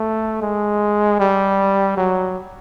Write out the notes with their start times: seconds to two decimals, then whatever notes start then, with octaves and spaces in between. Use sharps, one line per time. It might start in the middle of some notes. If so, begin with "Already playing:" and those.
Already playing: A3
0.42 G#3
1.20 G3
1.97 F#3